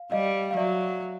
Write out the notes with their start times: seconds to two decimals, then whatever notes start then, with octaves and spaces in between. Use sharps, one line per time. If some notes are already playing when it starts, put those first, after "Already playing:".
Already playing: F5
0.12 G3 D#5 F5
0.51 F5
0.56 F#3 D5 E5